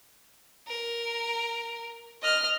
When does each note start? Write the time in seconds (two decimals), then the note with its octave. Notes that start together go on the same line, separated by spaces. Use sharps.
0.68 A#4
2.22 D#5 F6